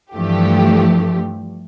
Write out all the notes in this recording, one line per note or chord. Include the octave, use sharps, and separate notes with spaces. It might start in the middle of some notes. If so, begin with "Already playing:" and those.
G2 E3 F3 A3 G4